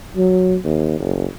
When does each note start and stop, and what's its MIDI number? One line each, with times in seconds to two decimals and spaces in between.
0.16 0.57 54
0.65 0.96 39
0.99 1.26 30